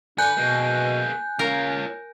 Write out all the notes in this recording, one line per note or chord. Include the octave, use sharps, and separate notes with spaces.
D3 D4 B4 G#5 F#6 G6
B2 A#3 G#4
A#3 C#4 F4 A#4 C#5